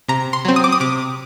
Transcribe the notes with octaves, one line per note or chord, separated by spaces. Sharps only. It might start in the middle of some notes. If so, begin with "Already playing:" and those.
C3 A#5
C6
F#3 C4
D#6
D6
D#6
C3 D6